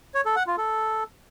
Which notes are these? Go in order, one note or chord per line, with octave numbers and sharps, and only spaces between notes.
C#5
A4
F#5
F4
A4